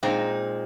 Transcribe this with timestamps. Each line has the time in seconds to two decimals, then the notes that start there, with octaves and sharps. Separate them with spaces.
0.03 A#2 G#3 C4 D#4